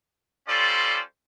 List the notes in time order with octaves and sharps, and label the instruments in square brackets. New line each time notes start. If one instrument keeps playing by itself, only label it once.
[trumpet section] G3 C#4 F4 A4 C5 D5